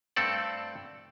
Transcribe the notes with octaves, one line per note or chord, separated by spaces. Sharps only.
G2 A3 C4 A4 D5 F#5